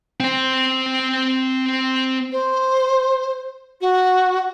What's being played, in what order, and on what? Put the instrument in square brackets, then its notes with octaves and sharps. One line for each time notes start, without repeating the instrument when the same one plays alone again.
[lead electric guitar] C4 C5
[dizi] C5
F#4